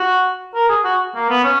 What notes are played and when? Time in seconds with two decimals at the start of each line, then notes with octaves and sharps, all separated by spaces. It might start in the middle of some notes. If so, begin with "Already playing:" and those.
Already playing: F#4
0.55 A#4
0.69 G#4
0.84 F#4
1.15 A#3
1.30 B3
1.44 C#4